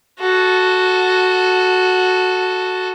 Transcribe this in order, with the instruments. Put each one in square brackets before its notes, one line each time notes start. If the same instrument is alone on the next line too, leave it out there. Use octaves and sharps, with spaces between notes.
[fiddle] F#4 A4